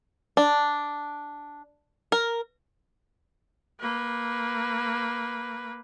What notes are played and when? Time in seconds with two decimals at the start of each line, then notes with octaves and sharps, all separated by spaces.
0.37 D4
2.12 A#4
3.80 A#3 B4